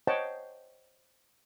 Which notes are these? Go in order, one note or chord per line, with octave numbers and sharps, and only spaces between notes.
C5 C#5 D#5 F#5 G5 A5